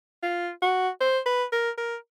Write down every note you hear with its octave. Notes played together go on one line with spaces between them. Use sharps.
F4
F#4
C5
B4
A#4
A#4